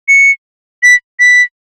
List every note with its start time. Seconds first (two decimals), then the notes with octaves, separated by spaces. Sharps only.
0.08 C#7
0.83 B6
1.20 B6